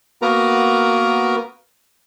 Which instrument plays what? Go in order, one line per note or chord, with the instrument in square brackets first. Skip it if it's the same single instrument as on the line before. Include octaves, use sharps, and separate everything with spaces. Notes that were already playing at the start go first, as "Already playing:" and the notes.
[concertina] A#3 B3 F#4 A#4 B4 A#5